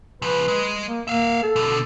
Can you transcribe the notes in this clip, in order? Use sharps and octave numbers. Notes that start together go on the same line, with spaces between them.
C#3 F3 B4
G#3 D#5
A#3
A#3 E5 F5
A4
B2 D3